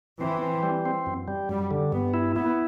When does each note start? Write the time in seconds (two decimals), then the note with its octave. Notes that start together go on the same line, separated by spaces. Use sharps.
0.21 E3 C4
0.42 C4
0.63 G3
0.85 C4
1.06 F#2
1.28 G3
1.49 F#2 G3
1.71 D3
1.92 G2 B3
2.14 E4
2.35 B3 E4